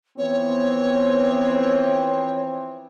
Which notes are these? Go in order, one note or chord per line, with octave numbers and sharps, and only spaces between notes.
E3 F3 B3 C4 C#5